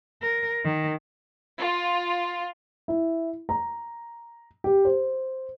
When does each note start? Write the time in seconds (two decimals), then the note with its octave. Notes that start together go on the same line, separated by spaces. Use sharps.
0.22 A#4
0.64 D#3
1.60 F4
2.88 E4
3.49 A#5
4.64 G4
4.85 C5